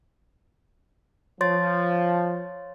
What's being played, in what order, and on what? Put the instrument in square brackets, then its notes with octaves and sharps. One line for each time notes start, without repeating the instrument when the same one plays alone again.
[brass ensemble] F3 [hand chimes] C#5 C6 A6